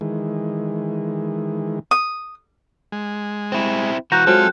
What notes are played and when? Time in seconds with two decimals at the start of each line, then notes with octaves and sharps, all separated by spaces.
0.01 D#3 E3 G#3
1.91 D#6
2.92 G#3
3.52 C4 E4
4.12 E3 F#4 A#5 F#6 G6
4.27 F#3 G#3 C4 F4 A4